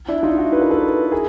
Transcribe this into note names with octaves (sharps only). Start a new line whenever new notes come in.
D4 E4
D#4 F4
E4 F#4
B4
A#4
A4 B4
G#4 A#4